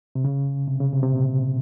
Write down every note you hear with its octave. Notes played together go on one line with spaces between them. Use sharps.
C3
C#3
C3
C#3
C3
C3
A#2